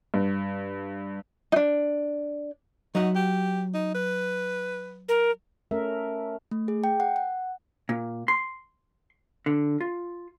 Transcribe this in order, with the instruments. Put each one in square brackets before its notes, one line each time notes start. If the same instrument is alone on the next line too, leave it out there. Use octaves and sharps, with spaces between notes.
[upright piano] G2
[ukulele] D4 D#4
[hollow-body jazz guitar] F#3 E5 F#5 [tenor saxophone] D#4
[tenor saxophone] G4
D#4
B4
[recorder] A#4
[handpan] A3 C#4 A#4 E5
[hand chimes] A3
G#4
G5
F#5
F#5
[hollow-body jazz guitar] A#2
C6
D3
F4